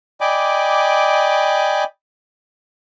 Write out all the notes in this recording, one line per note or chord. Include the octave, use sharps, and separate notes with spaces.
D5 D#5 G5 G#5 B5 D6